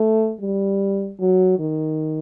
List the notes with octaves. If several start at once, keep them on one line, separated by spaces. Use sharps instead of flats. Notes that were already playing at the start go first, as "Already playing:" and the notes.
Already playing: A3
G3
F#3
D#3